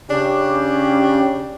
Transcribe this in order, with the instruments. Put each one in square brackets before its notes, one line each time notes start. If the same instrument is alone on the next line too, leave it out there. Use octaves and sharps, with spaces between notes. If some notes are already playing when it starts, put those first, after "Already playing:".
[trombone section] C#3 C#4 G4 [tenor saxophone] D4